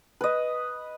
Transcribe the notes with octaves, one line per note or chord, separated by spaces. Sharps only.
B4 D#5